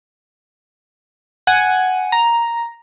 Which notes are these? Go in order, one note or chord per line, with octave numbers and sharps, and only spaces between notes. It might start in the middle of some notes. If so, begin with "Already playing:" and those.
F#5 G#5
A#5